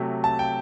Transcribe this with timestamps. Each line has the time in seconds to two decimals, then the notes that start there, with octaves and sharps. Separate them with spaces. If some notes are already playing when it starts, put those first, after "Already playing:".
Already playing: C3 F#3 A3
0.24 A5
0.39 G5